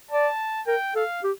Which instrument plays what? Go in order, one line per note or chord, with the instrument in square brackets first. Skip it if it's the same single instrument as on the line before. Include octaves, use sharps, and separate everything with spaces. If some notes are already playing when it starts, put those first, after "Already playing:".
[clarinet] D5 [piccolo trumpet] A5
[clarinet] A#4 [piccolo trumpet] G5
[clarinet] A4 [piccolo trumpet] F5
[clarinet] G4